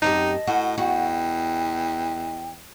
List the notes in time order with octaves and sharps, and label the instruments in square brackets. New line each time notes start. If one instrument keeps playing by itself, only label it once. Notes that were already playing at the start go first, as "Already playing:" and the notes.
[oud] F#2 C4 G4 [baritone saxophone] D#4 [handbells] D#5 A5
[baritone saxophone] A2 [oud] F#4
[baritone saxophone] E2 [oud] F#4 [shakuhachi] G5